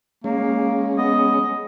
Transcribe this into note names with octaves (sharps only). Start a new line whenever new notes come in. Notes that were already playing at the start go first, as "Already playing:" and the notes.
G#3 A#3 C#4
B3 D#5